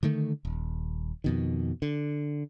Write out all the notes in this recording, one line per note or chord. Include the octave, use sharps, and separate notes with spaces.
D3 D#3 A3
D#1
F2 B2 D#3
D3